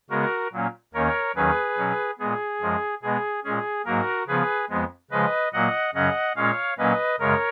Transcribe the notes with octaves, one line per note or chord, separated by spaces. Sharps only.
C#3 G#3 B3 F#4 A#4
A#2 F#3 A#3 C#4
D#2 D#3 A#3 C#4 A#4 C#5
D#2 D#3 F#3 C#4 G#4 B4
B2 F#3 C#4
A#2 G#3 B3 G#4
F#2 F3 G#3
B2 G#3 B3 G#4
A#2 G#3 C#4 G#4
G#2 F#3 A#3 F#4 A#4
C#3 F3 B3 G#4 B4
F2 F3 G#3 B3
C#3 F3 G#3 B4 D#5
A#2 F#3 A#3 D#5 F#5
F#2 C#3 F#3 C#4 D#5 F#5
A#2 G#3 C#4 C#5 F5
A#2 F#3 A#3 C#4 B4 D#5
F#2 C#3 G#3 A#4 C#5